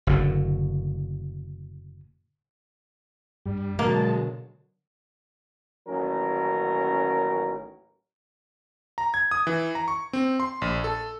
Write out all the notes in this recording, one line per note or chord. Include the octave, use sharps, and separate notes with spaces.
F#1 A2 D3
G2 G3
B2 D3 F#3 G#3 A#3 A5
A1 D#2 F#3 C#4 A#4
A#5
G#6
D#6
E3
A#5
C#6
C4
C6
A#1
A4